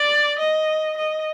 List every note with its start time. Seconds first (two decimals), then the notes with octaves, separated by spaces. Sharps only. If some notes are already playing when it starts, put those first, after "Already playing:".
Already playing: D5
0.39 D#5
0.98 D#5